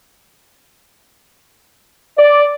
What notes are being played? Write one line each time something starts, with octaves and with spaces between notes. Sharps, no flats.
D5